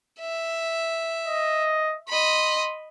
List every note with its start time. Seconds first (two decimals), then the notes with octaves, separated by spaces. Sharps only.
0.20 E5
1.28 D#5
2.09 D#5 B5 C6